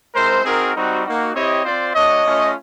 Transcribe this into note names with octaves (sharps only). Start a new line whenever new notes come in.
G#3 C4 E4 A#4 C5
C4 D#4 F#4 G#4 A#4
G3 C4 D#4 F#4
A#3 D#4 F#4
C4 E4 G4 C#5 D#5
C4 F4 C5 D5
A3 D4 F#4 C#5 D#5
A3 C#4 F4